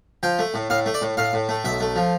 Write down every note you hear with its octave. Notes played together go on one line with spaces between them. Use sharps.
F3 G5
A3
A2
A2 F5
A3
D5
A2
A2 F5
A2
A3
B1 E5
A3
F3